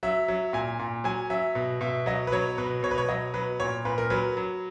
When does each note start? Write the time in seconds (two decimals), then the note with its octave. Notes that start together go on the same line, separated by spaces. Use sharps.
0.03 F#3 E5
0.28 F#3
0.53 A#2 G#5
0.79 A#2
1.04 F#3 G#5
1.30 F#3 E5
1.55 B2
1.81 B2 E5
2.06 F#3 D#5
2.27 B4
2.32 F#3 C#5
2.58 B2 B4
2.83 B2 C#5
2.91 B4
2.98 C#5
3.09 F#3 D#5
3.34 F#3 B4
3.60 A#2 C#5
3.85 A#2 B4
3.98 A#4
4.10 F#3 B4
4.37 F#3